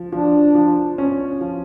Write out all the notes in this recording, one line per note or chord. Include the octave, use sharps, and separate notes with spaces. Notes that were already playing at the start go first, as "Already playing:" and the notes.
Already playing: F3
F3 D4
F3
C#4
F3